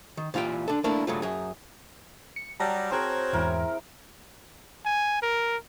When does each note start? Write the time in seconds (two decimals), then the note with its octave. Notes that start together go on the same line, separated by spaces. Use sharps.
0.17 D#3
0.34 A#2 E3 F4 G4 G5
0.68 D4 A4
0.84 A3 A#3 D4 E4 A#4
1.07 G2 C#3 F#3 A3 F4
1.22 F#2 G#4
2.36 C#7
2.60 F#3 G3 A5 A#5 A#6
2.91 C4 F#4 G#4 A#4 C5 C#5
3.33 E2 G#2 E4 A#4
4.85 G#5
5.22 A#4